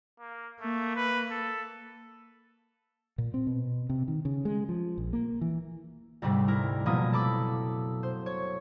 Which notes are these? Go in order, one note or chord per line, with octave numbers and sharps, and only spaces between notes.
A#3
A3 A#3
B4
A4
A#2
C4
B2
C3
D#3
C#3
G#3
F3
A#1
A#3
E3
D2 G#2 C3 G3 C4
E4 A#4
F#1 B2 F3 A#3 E4 D#6
A4 B5 D6 E6
C5
C#5